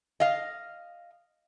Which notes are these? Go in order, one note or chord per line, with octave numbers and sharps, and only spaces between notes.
D#5 F5